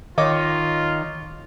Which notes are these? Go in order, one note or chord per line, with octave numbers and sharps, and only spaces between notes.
D#3 F4 C#5 D#5 D6